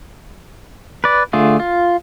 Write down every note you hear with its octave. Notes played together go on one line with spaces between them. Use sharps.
B4 D5
D3 A3 F4 G#4
F4